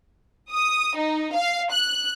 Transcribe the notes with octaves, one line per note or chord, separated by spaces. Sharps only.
D#6
D#4
F5
F#6